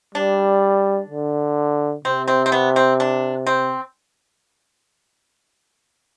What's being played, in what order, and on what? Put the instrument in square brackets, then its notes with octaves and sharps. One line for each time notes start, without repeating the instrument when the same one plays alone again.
[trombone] G3 [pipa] D4
[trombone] D3
[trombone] C3 [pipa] C4
[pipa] C4
C4
B3
C4
D4
C4